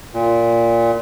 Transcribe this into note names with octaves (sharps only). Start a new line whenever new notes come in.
A#2